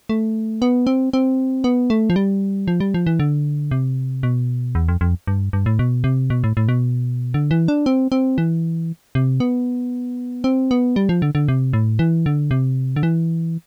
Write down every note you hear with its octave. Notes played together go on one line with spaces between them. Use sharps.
A3
B3
C4
C4
B3
A3
F3
G3
F3
G3
F3
E3
D3
C3
B2
E2
F2
F2
G2
G2
A2
B2
C3
B2
A2
A2
B2
D3
E3
D4
C4
C4
E3
C3
B3
C4
B3
G3
F3
D3
D3
C3
A2
E3
D3
C3
D3
E3